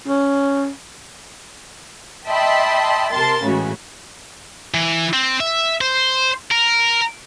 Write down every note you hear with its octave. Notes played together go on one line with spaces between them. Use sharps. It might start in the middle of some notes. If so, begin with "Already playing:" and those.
C#4
D#5 E5 G5 A5 B5 C6
C3 A#4 A5 C6 A6
A2 C#3 E3 G#3 F#4
E3
C4
E5
C5
A#4